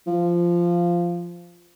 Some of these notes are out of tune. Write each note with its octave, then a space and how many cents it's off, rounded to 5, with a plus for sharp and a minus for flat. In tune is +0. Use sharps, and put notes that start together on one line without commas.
F3 -10